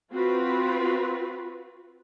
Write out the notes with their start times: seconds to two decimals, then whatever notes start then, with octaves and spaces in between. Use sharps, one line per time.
0.12 C4 F4 F#4 B4